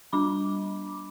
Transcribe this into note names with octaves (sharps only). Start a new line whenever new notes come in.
G3 D4 B5 D6